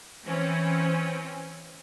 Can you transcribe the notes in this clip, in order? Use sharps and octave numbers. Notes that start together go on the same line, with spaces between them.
E3 C4 C#4